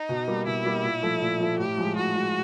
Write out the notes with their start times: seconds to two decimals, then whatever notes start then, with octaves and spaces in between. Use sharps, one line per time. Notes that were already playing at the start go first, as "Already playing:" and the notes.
Already playing: D#4
0.09 B2
0.28 G3 A#3
0.46 B2 E4
0.65 G3 A#3
0.84 A#2
1.03 F3 A3
1.22 A#2
1.40 F3 A3
1.59 A2 G4
1.78 F3 G#3
1.96 A2 F#4
2.15 F3 G#3